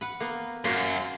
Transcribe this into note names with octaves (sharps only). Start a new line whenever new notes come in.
B4 F#5
A#3 B3
F#2 A#3 F4 F#4